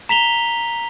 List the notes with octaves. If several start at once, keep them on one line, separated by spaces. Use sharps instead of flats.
A#5 B6 F7 G7